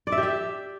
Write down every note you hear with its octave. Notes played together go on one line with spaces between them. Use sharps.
D5
E5
G4
E5